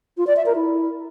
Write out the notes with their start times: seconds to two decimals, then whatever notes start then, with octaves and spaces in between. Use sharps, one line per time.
0.17 F4
0.27 D5
0.36 E5
0.46 A#4
0.56 E4